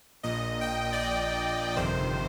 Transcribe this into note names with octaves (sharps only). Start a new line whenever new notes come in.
A#1 A#2 D#5
G5
D5
D#5
G1 F2 C3 D#3 C5